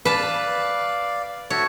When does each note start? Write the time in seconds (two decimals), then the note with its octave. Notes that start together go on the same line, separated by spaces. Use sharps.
0.05 B4 D5 F5 A5
1.50 F#4 A4 C#5 E5